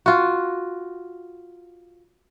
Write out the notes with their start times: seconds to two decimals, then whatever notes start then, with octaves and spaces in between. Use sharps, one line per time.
0.06 F4 F#4